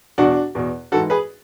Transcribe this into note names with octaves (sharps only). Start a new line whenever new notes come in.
E2 B2 D4 F#4
E2 B2
G#2 E3 F#4 A4
G#4 B4